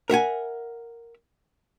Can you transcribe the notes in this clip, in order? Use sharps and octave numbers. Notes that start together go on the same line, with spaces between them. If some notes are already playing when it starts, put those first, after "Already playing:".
A#4 E5 F#5 G#5